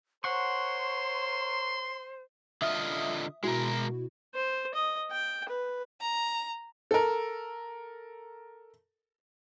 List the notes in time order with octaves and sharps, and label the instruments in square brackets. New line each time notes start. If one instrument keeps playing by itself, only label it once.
[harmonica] A#4 C#5 [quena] C5 [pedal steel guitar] F#5 C#6 [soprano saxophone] C6
[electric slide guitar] D3 F4 D#5 [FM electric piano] E5 D#6
[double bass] B2 [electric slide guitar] G#3 A#4 [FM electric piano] E4 F#4
[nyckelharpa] C5
D#5
G5
B4
[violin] A#5
[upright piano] A4 A#4